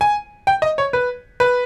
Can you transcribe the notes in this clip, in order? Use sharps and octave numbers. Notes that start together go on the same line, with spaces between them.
G#5
G5
D#5
C#5
B4
B4